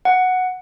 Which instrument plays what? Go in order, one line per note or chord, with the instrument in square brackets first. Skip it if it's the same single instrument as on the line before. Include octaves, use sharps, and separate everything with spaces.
[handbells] F#5